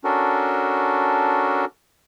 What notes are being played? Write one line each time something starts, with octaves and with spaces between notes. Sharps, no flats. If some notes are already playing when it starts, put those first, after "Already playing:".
C#4 D4 F#4 A4 A#4